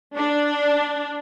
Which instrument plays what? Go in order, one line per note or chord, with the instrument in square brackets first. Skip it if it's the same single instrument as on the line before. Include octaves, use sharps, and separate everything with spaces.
[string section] D4